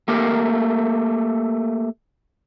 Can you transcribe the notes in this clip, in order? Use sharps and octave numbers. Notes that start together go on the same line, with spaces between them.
A3 A#3 G4 A#4